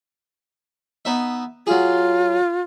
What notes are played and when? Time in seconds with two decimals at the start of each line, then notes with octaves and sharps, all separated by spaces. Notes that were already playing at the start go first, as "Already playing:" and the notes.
1.05 B3 D#4 E5
1.67 F#3 F4 G#4